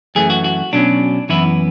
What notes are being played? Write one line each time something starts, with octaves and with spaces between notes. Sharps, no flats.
F#2 E3 A3 G#4
F#4
F#4
B2 F#3 C#4 D4
F#2 E3 B3 E4